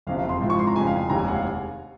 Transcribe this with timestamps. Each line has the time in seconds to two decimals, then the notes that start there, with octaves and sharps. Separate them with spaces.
0.07 F#1 F2 C3 F5
0.18 F5
0.29 C6
0.41 G#2 F3 C4
0.50 C#6
0.59 C6
0.67 A#5
0.75 F1 F2 C#3 G#5
0.87 F5
1.10 F1 D#2 D#3 G#3 A#5
1.19 G#5
1.28 F#5
1.35 F5